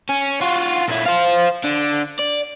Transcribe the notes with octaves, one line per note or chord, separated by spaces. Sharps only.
C#4
F4 F#4
A#2 E4
C5 F5
D3
D5